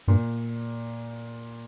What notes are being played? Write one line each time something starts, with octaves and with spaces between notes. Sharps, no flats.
G2 A#2